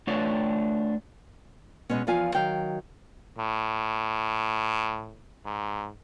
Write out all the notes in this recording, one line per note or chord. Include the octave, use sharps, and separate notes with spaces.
A3 D4 F4 B4 C#5 F5
B2 G#3 B3 C#4
E2 F3 F4 F5 G#5
D#3 F#3 F5 G5
A2
G#2